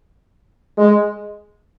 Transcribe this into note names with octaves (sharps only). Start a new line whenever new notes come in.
G#3